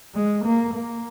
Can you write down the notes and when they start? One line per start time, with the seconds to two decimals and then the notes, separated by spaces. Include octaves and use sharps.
0.14 G#3
0.44 A#3
0.74 A#3